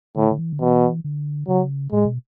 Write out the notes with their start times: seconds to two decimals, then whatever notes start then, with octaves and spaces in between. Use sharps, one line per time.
0.16 A2 D3
0.31 D3
0.38 E3
0.53 D3
0.61 B2 E3
1.04 D3
1.48 C#3 F#3
1.92 A2 G#3
2.05 B2